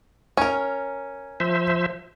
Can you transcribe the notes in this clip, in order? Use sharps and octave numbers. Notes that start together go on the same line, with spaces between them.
C#4 A#4 G#5
F3 C5 E5